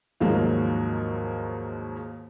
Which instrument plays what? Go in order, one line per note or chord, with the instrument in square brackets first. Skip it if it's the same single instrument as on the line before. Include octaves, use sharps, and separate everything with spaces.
[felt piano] D#2 G#2 F3 F#3 G#3 A#3